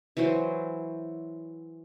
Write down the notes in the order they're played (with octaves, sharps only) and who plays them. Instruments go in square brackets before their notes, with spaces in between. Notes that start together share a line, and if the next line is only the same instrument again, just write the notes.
[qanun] E3 F#3 F#4 C5